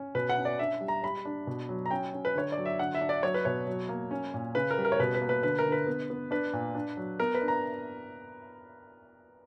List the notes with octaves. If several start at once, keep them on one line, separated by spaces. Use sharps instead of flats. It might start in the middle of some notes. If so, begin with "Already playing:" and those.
Already playing: C#4
B2 B4
F#5
C#4
D5
D4 E5
G3
A#5
G3 B5
D4
B2
F#3
A#5
C#4 G5
C#4
B4
D3 C#5
D5
F#3
E5
D3 F#5
E5
D4
D5
F#3 C#5
B4
B2 C#5
F#3
A#3
C#4
A#2
C#3 B4
A#4
G3
A#4
C#5
B2 B4
B4
A#3
B4
D3 B4
A#4
D3
B4
B3
B3
D4 B4
A#2
D4
F#3
B3 A#4
B4
D4
A#5